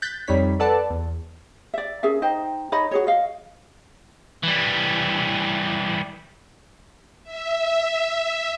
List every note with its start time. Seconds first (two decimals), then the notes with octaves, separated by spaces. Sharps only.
0.02 F#6 G6 A6 B6
0.28 F2 G3 D#4 C#5 B6
0.60 A4 B4 D5 F#5 A5
0.90 E2
1.74 D5 E5
2.03 C#4 G#4 A#4 E5
2.22 D#4 C5 D#5 G5
2.72 D#4 C#5 D#5 B5
2.91 F#4 G#4 C#5
3.07 D#5 F5
4.44 E3 G3
7.23 E5